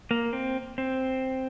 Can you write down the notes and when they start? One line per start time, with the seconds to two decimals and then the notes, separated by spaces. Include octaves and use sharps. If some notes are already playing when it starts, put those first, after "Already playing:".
0.11 A#3
0.33 C4
0.78 C4